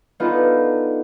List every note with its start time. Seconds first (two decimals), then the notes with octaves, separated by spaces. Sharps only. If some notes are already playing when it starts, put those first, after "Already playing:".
0.20 B3 D4 D#4 F4 A4